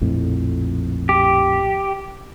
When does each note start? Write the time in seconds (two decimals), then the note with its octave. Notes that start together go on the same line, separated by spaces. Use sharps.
0.01 A#1 F2 A2
1.09 G4